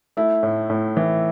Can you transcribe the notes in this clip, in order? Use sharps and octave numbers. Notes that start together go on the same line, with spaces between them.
A3 E4
A2
A2
E3